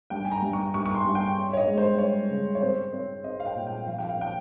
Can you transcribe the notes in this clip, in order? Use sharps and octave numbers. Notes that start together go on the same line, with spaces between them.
G2 G5
G#5
A#5
G2
C#6
G2 C#6
C#6
C6
G2
G5
C#4
C#5
D#5
G#3
C5
C#4 C#5
C#3
C#5
C4 C5
C4 C#5
C4 D#5
F5
G5
A#2
G5
F3 F5
G5
F5
C#4 G5